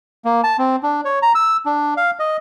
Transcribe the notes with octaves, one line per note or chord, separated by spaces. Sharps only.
A#3
A5
C4
D4
C#5
A#5
E6
D4
F5
D#5